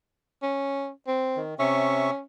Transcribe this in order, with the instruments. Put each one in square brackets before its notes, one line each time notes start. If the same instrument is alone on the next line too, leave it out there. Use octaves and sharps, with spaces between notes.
[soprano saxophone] C#4
C4
[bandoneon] D#3
[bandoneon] C3 E5 C#6 [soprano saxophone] C#4